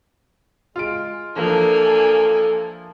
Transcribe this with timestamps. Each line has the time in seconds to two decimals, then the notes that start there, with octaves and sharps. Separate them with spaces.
0.76 G#3 F4 D7
1.36 E3 F3 A#3 D4 A4 G#5